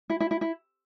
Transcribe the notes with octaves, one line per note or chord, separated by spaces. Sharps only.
E4
E4
E4
E4